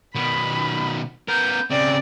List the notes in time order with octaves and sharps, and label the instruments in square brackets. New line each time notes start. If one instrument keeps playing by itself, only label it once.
[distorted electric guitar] B2 D#3 [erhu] B5
[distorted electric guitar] B3 A#4 [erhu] G6
[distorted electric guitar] C#3 C4 [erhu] D5